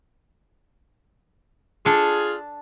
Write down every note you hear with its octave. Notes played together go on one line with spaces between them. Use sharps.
D4 F4 G#4 A4